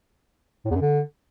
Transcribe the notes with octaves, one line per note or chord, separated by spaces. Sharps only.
A2
E2
F#2
D3